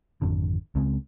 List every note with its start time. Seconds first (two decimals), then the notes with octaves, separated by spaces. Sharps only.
0.22 G#1 F2 D3
0.75 C#2 C#3 G#3 C4